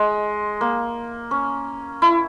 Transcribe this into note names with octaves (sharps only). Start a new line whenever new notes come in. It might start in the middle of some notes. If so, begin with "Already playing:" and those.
Already playing: G#3
A#3
C#4
E4